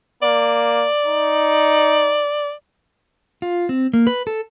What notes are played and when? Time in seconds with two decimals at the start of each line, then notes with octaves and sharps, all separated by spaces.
0.22 A#3 D5
1.06 D#4
3.42 F4
3.69 C4
3.93 A#3
4.07 B4
4.27 A4